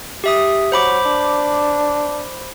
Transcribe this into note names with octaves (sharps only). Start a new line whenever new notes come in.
G4 E5 D#6
F#3 C5 B5 D6
D4